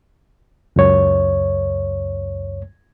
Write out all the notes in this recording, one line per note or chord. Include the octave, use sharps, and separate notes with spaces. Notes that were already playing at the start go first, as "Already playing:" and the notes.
C#2 F#2 C#5